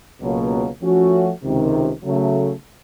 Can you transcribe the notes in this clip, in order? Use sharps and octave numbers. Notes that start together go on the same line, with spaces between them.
C#2 B2 F#3 A#3
F3 A3 C#4 F#4
C#2 C3 D#3
C#3 F#3 A3